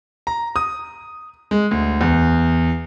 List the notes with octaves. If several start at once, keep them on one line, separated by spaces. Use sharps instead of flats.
A#5
D#6
G#3
D2
E2